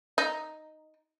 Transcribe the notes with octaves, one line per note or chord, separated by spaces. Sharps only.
D#4